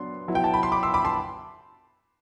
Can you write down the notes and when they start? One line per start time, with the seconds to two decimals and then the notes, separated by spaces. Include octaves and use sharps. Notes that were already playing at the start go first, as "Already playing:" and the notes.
Already playing: F#3 B3 D4 C6
0.28 F#3 B3 E4
0.35 G5
0.44 A5
0.54 B5
0.63 C6
0.72 B5 D6
0.83 C6 E6
0.94 B5 D6
1.05 A5 C6